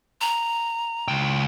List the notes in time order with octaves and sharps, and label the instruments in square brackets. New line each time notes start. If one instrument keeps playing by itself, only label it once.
[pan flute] A#5
[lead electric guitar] C#2 G5